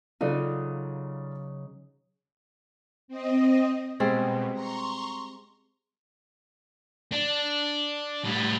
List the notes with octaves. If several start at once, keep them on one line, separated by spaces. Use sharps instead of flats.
C#3 F#3 D#4 F4 A4 D5
C4 D#5
B2 G3 G#3 C4
A#5 C6 C#6
D4
A2 G3